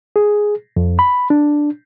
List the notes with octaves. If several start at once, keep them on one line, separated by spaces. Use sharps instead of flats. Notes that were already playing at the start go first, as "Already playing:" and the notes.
G#4
F2
B5
D4